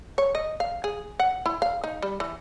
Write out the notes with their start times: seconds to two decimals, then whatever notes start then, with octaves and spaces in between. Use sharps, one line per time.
0.18 C#5
0.35 D#5
0.60 F5
0.84 G#4
1.20 F#5
1.46 E4
1.62 F5
1.84 D#4
2.02 G3
2.20 E3